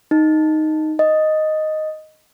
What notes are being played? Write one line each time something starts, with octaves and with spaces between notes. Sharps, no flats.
D#4
D#5